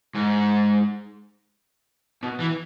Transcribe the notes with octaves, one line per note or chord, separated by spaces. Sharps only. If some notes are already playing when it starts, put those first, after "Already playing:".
G#2
B2
E3